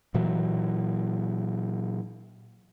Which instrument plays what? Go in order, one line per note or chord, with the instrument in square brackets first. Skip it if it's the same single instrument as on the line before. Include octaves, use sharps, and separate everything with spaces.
[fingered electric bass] A#2 E3 F#3